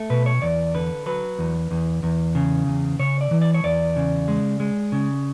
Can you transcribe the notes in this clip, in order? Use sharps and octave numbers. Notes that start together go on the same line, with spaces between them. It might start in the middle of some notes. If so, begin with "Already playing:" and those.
Already playing: A3
B2 B4
C#5
E2 D5
D3 B4
F#3 B4
E2
E2
E2
C#3
E2
C#3 C#5
D5
E3
D5
C#5
E2 D5
C#3
G#3
G#3
C#3